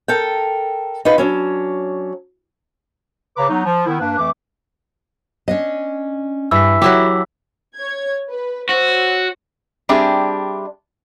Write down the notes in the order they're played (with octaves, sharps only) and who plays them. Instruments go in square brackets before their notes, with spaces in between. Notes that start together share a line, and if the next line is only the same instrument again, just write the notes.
[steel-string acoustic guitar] A4 A#4 G5
D#4 F4 B4
F#3 C#4 D4
[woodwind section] C#3 B4 C#5 A#5 D6
F#3 B3 D#4
F3
D#3 B3 E4
G2 A#3 D4 B4
F2 E3 A3 D6
[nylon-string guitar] C#4 D4 D#5
[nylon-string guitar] G2 [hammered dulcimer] E3 [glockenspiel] E6 B6
[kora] F#3 E4 G4 [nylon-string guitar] F#4 A4 E5
[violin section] C#5 G#6
B4
[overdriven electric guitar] F#4 [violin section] C5 C#5 E6
[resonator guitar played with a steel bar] G3 C4 D4 G4 G#4 E5